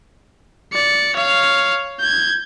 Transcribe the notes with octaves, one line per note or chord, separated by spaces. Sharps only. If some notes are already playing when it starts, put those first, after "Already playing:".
D5 C#7
C#5 F5
G6 G#6